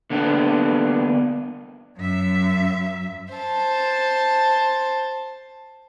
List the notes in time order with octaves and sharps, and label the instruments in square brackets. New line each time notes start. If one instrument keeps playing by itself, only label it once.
[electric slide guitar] D3 A#3 B3 D4
[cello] F#2 E5
[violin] C5 A5